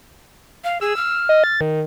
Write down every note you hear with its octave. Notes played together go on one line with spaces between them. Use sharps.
F5
G#4 E6
F6
D#5
A6
D#3